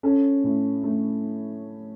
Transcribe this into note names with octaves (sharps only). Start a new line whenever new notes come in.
C#4 A4
A2
A3